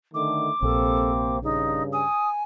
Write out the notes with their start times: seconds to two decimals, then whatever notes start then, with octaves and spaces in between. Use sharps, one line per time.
0.14 D3 D#3 A3 D6
0.62 A#1 C3 A#3 C4 A4
1.43 G2 C#3 D#4
1.92 G#5 D#6